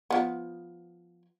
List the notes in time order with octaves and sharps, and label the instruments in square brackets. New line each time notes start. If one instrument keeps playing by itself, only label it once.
[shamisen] F3 B3